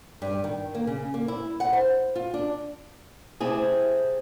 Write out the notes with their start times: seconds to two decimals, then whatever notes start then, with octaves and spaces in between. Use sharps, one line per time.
0.22 G2
0.44 D#3
0.75 A#3
0.87 C#3
1.14 A#3
1.28 E4
1.60 F#5
1.73 C5
2.15 F4
2.34 D4
3.40 C3 A3 C4 E4 G#4